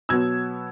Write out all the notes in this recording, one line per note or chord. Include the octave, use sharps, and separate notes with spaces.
B2 F#3 B3 E6 G#6